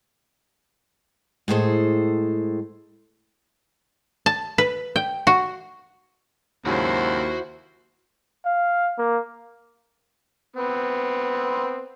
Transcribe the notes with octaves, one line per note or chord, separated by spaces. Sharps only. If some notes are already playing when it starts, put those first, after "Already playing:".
A2 G#3 G#4 A4 C5
A5
B4
G5
F#4
D#2 G#2 C#3 F#3 E4 F#4 C5 F#5
F5
A#3
B3 C4